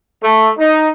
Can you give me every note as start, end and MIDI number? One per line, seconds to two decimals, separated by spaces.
0.23 0.50 57
0.59 0.88 63